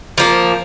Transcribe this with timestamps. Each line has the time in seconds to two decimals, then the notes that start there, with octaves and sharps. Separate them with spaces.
0.18 F3 A#3